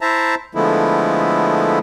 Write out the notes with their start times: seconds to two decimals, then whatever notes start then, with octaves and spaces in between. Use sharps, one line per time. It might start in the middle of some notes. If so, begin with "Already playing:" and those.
0.01 E4 C5 E5 A5 A#5
0.55 D3 F3 G#3 A3 B3 E4